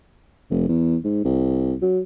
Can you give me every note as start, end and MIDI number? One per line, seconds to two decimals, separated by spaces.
0.50 0.68 29
0.69 0.96 40
1.04 1.22 44
1.24 1.74 36
1.82 2.00 54